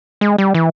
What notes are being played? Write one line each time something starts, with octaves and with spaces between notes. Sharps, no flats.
G#3
G3
E3